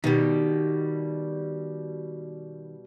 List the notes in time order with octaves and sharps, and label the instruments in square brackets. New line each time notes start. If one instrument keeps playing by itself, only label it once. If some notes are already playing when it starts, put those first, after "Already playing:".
[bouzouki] B2 G3 [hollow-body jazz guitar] D#3